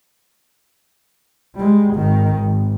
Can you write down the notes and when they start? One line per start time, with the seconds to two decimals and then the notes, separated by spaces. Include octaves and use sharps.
1.55 G3 G#3
1.95 G#1 D#3
2.35 G#1